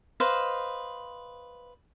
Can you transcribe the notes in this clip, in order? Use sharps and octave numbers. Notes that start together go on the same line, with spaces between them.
B4 C5 D#5 F5